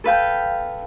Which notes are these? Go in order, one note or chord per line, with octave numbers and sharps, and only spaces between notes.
A4 B4 F5 G5